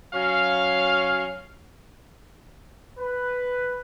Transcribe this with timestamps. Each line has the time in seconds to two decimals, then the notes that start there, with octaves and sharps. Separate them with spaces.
0.14 F#3 C#4 F5
2.98 B4